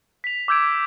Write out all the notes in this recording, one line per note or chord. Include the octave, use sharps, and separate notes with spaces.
B6 F7
D6 E6 G6 G#6 D7